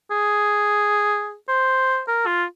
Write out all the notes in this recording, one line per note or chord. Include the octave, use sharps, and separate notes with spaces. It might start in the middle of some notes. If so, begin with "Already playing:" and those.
G#4
C5
A#4
F4